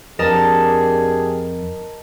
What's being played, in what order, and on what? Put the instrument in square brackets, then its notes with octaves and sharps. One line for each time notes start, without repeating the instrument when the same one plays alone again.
[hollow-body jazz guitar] F2 [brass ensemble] D4 G4 G#4 [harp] A#4 D#5 A5